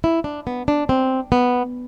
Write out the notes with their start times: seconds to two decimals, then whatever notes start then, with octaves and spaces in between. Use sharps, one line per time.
0.04 E4
0.24 D4
0.47 B3
0.68 D4
0.89 C4
1.32 B3